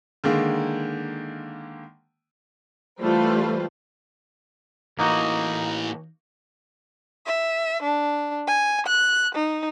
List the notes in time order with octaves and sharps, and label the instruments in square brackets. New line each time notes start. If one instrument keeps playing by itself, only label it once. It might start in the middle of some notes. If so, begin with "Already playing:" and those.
[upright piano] D3 D#3 G#3 A#3
[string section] E3 G3 A3 F4 B4 C5
[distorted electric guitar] A2 E3 [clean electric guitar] A#3 D#4 F#4
[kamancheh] E5
D4
G#5
F#6
D#4